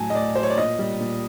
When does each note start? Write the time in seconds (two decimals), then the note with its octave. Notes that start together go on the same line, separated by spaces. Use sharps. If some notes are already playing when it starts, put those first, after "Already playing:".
Already playing: A2 F#3 G#5 A5
0.10 D#5
0.15 A2 D5
0.35 F#3 C5
0.43 C#5
0.50 D5
0.58 A#2 D#5
0.79 G3
1.01 A#2